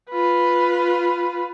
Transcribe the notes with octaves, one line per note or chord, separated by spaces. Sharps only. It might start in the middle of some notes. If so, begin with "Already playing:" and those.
F4 B4